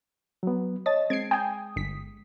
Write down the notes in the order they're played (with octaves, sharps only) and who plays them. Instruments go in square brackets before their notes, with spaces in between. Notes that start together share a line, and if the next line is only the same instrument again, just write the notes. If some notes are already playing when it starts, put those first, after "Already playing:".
[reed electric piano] F#3 B3
[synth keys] C#5 D#5 A5 [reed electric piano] D#6 [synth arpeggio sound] A6
[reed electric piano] G#3 [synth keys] C4 D7 [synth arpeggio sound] G#6 C7
[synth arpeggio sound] G5 G#5 [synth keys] D#6
[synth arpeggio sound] G1 B6